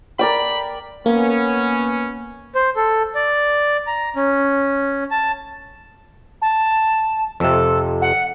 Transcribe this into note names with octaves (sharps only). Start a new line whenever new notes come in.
A#4 D5 G5 B5
A#3 B3 C#4
C5
A4
D5
A#5
C#4
A5
A5
F2 C3 A4
F#5